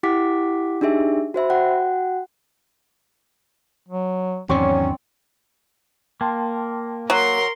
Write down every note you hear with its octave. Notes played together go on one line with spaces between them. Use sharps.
E4 G4 F#5 D6 B6
D4 D#4 G4 G#4 E5
F#4 C5 E5 B5
F#4 F#5 G5
F#3
E2 G#2 D#3 F#3 C4 C#4 C#5 D5
A#3 G5 A5 C6
F#3 A#4 C6